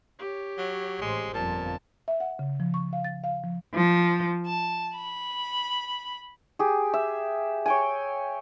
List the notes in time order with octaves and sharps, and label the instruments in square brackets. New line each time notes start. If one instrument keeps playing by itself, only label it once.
[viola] G4 C#5
[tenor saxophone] F#3
[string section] A1 C5 [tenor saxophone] G#3
[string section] G1 F2 [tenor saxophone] A#2 [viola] A5
[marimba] E5
F#5
C#3
F3
C#6
F5
A6
F5
F3
[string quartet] F3
A5
B5
[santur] G4 G#4
E5
C#5 G5 G#5